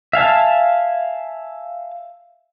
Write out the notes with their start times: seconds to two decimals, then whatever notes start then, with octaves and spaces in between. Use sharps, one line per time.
0.13 E5 F5 G#5 A5